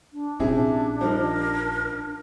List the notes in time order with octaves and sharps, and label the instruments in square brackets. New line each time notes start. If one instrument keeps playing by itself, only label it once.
[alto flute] D4
[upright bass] A#1 C#4 [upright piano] C3 E4 G#4
[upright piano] F3 G3 D#4 [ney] A#4